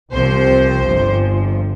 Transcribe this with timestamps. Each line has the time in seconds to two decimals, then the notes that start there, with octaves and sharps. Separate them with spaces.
0.11 C2 C3 F3 C4 C5
0.85 G1 G2 F3